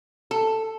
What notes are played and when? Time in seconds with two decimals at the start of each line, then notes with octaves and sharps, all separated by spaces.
0.31 A4